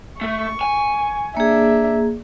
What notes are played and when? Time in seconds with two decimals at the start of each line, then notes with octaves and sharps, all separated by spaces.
0.21 A3 C#6
0.61 G#5
1.37 A#3 D4 G#4 E5